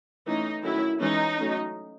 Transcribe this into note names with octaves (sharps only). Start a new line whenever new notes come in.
E3 A3 C#4 D#4
D#3 F#3 A3 C#4 E4
E3 G#3 C#4 D#4
F#3 A3 C#4